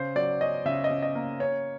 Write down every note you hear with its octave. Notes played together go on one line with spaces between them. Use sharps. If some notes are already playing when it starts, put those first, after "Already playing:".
Already playing: C#3 C5
F#3 D5
C#4 D#5
C#3 E5
D#5
C#3
D#5
A#3
C#4 C#5